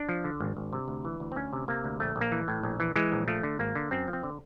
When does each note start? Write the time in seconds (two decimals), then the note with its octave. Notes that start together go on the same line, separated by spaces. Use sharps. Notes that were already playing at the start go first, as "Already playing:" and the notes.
Already playing: D4
0.09 F3
0.24 D3
0.40 G#1
0.57 G#1
0.73 C3
0.88 D2
1.05 E3
1.20 D2
1.32 C4
1.36 D2 C#4
1.53 C3
1.68 C3 A#3
1.84 D2
2.00 A#1 A3
2.16 A#1
2.21 A#3
2.32 E3
2.48 A2
2.63 A#1
2.80 E3
2.96 E3 G#3
3.12 A#1
3.28 F3 A3
3.43 D3
3.59 G#1 A#3
3.75 D3
3.91 F#2 C4
4.08 F3
4.13 C4
4.23 D3